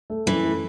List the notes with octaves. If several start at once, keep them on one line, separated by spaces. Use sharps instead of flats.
A3
F#2 E3
A3